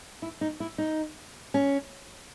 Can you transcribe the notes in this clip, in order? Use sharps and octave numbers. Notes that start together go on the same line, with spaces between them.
E4
D#4
E4
D#4
C#4